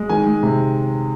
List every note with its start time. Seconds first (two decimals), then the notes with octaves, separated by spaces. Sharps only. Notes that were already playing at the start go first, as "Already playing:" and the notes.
Already playing: G#3
0.09 D#3 G#5
0.27 G#3
0.43 C3